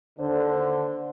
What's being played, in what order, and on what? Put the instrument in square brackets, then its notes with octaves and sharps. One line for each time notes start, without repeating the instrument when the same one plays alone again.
[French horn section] D#2 D4 C5 [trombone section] D3